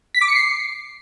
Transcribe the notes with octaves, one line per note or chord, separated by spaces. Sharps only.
B6
D6
C#7
C7